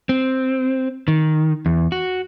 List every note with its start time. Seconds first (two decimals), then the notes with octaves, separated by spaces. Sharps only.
0.09 C4
1.08 D#3
1.66 E2
1.92 F#4